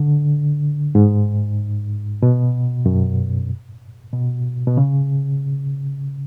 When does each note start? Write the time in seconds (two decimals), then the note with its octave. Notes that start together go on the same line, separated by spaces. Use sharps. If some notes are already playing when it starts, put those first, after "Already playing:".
Already playing: D3
0.95 G#2
2.22 B2
2.86 F#2
4.13 B2
4.67 B2
4.77 C#3